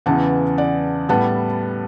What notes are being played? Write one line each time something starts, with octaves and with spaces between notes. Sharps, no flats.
E2 C#3 E3 B3 F#5 A5
D5 F#5
A2 G3 B3 F#5 A5